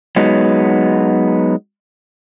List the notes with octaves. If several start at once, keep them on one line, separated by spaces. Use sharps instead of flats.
F#3 G#3 B3 D#4